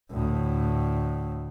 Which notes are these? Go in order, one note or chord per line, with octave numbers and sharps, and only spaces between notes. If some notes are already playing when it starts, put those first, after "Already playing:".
D2 A2